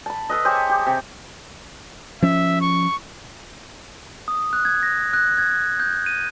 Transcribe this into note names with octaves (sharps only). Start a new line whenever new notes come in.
A5 B5
A4 B4 D#5
G4 G#4 C5 C#5
G4
C3
F3 C#4 E5
C#6
D#6
F#6
G#6
A#6
F#6
G#6
G6
D#7